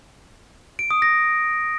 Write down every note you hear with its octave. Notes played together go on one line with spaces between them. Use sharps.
D7
D#6
A#6